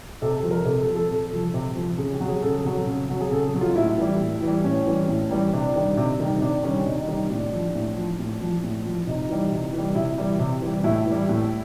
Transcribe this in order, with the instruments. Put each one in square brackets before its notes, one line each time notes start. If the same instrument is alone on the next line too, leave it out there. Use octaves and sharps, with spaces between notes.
[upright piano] C3 A4
A4
F3
A#4
C3 A4
A4
F3
A4
C3
F3
C3
F3
C#3 G#4
G4
F#3
G#4
C#3 A4
F#3
C#3
F#3
G#4
C#3 A4
F#3
F4
A2 E4
E3 G3
A2
E3 G3
A2 C#4
E3 G3
A2
E3 G3
C3 D4
D#3 G3
C3
D#3 G3
C3 D4
D#3 G3 C#4
C3 D#4
D#4
D#3 G3
A2 D4
F3
A2
F3
A2
F3
A2
F3
C3 D#4
E3 G3
C3
E3 G3
C3 E4
E3 G3
C3
E3 G3
A2 E4
E3 G3
A2